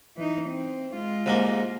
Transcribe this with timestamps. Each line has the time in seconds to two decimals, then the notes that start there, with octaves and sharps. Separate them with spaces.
0.17 E3 D#4
0.49 C4
0.94 G#3 F4
1.26 C2 G#2 A#3